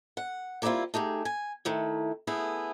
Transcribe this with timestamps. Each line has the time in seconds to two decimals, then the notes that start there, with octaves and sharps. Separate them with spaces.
0.17 F#5
0.62 G3 A#3 C4 D4 E4 F4
0.94 A3 D#4 G4 G#4
1.25 G#5
1.65 D#3 A3 E4
2.27 A3 B3 E4 G#4